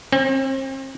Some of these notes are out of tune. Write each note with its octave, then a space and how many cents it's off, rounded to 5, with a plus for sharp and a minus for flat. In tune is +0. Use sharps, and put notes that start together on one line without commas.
C4 +40